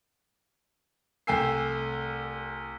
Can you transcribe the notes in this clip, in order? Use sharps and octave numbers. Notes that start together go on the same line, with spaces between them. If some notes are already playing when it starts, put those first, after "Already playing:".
C2 A3 G5 G#5 E6 C7